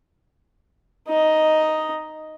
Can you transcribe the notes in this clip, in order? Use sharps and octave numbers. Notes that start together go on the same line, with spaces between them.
D#4 D#5